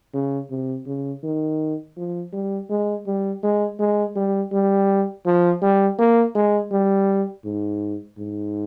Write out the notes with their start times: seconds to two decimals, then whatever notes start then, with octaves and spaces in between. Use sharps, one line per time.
0.14 C#3
0.50 C3
0.87 C#3
1.24 D#3
1.97 F3
2.33 G3
2.70 G#3
3.07 G3
3.43 G#3
3.79 G#3
4.16 G3
4.53 G3
5.26 F3
5.62 G3
5.98 A#3
6.35 G#3
6.72 G3
7.45 G#2
8.18 G#2